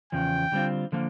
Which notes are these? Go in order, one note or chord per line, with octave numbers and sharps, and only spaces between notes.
E2 C#3 F3 G5
D3 G3 C4 F4
D3 F3 A#3